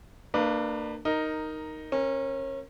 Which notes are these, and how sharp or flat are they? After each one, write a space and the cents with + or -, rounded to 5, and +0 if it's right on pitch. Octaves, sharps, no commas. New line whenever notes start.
A#3 -25 D4 +30 B4 -15
D#4 +0 A#4 -5
C#4 -30 A#4 +0